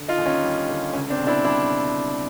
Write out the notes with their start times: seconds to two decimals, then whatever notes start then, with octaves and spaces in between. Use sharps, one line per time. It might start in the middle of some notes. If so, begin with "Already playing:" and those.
Already playing: D3
0.08 D#4 F4
0.18 D#2
0.26 C#4 D#4
0.43 G3
0.69 D3
0.93 C#2 C#4
1.10 C4 D4
1.19 B2
1.27 D4 E4
1.45 G3 D4 E4